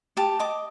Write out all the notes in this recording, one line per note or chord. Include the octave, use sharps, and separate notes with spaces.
G4 A5
D#5 D6